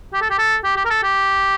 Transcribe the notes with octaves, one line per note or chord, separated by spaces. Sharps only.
G4
A4
G4
A4
G4
G4
A#4
A4
G4